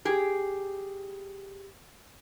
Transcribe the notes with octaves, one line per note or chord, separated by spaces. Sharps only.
G4 G#4